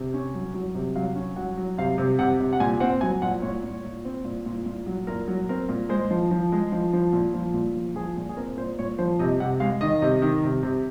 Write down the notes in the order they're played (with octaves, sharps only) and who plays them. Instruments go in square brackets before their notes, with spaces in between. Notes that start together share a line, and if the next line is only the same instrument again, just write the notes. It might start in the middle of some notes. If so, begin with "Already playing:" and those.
Already playing: [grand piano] C3
C#4
F#3
F#3
C3
F#3 F5
C#4
F#3 F#5
F#3
C3 F5
C3
C3 F#5
C3
F#5
A#2 G#5
C4 F#5
F#3 G#5
A#2 F#5
A#2 C#5
A#2
A#2
C4
A#2
A#2
A#2
F#3
A#2 A#4
F#3
C4 A#4
A#2
G#3 C5
F3
F3
G#3
F3
F3
A#2
F3
A#2
F3
F3 G#4
A#2
G#4
C4 A#4
A#2 C5
A#2 C#5
F3 C5
C3 D#5
C3 F#5
G#3 F5
D#3 D#5
C3
D#3
C3
C3